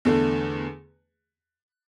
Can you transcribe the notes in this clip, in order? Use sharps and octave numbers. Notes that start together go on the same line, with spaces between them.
E2 D3 A3